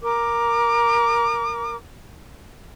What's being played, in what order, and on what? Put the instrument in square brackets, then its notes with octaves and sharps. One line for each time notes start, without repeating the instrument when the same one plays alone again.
[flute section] A#4 D6